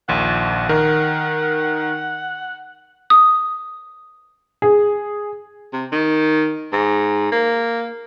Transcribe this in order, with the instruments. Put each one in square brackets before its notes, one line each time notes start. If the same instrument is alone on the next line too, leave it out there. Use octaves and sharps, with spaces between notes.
[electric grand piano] A#1 D#2 A#2 [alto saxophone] F#5
[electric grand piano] D#3 A#4
[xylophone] D#6
[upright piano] G#4
[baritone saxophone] C3
D#3
G#2
A#3